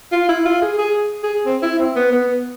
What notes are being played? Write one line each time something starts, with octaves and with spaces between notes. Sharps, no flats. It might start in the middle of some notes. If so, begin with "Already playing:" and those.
F4
E4
F4
G#4
G#4
G#4
C4
E4
C4
B3
B3